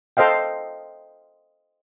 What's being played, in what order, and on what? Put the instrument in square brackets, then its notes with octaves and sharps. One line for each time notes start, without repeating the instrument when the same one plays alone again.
[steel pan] A4 C5 D#5 F5 G5